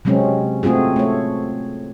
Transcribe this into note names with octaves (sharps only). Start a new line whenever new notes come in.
C3 F#3 G#3 C4 C#4
A3 C4 F4 F#4 G#4
A3 C#5